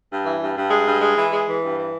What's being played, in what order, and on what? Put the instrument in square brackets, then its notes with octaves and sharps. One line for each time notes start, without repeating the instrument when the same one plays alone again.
[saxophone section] G2
E3
G2
G2
G#3
G2
G#3
E3
G#3
E3
G2
E3